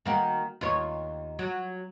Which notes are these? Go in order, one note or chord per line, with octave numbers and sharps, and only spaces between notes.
D#3 A#3 F#4
D#2 F4 C#5
F#3